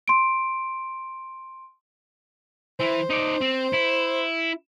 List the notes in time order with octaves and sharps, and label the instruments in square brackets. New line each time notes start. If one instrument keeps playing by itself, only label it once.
[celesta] C6 D7
[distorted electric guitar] E3 E4 [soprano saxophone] C5
[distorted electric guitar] D#4 D5
C4
E4